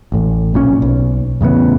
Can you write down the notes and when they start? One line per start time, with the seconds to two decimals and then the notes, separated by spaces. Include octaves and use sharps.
0.12 A1 A2
0.54 B1 A#2 C#4
0.82 B1
1.41 E2 A2 C#3 B3